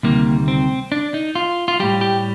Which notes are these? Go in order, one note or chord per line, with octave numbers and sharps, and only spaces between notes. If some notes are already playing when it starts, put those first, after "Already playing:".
D2 C3 D#3 G3 A#3
C4
D4
D#4
F4
F4
A2 G3 G4
G4